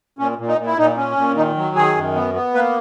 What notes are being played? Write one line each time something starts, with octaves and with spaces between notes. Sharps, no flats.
A#2 C#4
A#2
D#4
A#2
E4
A#2 D#4
C#4
A#2
D#3 D#4
F#3
D#3 G#4
F#2
B3
B3
A#3 B4